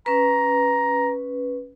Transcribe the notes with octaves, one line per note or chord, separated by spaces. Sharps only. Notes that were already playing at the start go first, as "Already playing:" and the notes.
C#4 B4 A#5